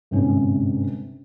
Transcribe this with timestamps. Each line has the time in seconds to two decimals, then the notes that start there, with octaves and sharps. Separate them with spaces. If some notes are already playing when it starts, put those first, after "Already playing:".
0.11 G1 G#2 C3 C#4